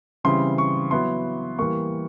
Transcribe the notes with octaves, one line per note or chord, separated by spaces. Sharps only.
C#3 E3 G3 C4 E4 C6
C#6
F#3 B3 E4 C6
E3 G3 A#3 C#6